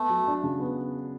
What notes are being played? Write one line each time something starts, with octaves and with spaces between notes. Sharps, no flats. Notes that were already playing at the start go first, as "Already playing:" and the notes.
Already playing: A3 B3
F#3
D4
C#3
B3